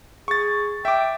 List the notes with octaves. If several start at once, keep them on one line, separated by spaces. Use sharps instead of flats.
G#4 C#6 A6
E5 G5 D6